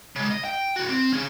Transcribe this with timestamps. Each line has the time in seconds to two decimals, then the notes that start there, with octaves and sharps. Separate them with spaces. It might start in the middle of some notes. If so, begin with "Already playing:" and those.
0.16 C#3 G#3
0.31 D#5
0.45 G5
0.76 E4 F#4
0.89 C4
1.13 C#4 G#4